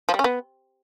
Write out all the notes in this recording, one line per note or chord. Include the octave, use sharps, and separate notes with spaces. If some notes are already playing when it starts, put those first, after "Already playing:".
F3
G3
C#4
B3